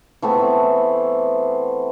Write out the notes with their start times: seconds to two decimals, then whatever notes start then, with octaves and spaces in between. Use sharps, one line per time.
0.22 E3 A3 B3 C4